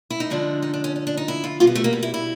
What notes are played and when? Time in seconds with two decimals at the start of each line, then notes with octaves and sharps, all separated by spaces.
0.10 E4
0.20 D#4
0.30 D3 F3 G#3 D4
0.63 D#4
0.74 D4
0.84 C#4
0.96 C#4
1.07 D4
1.17 D#4
1.28 E4
1.44 F4
1.60 B2 G3 F4
1.67 B3
1.75 A3
1.84 A#3
1.93 B3
2.03 E4
2.14 E4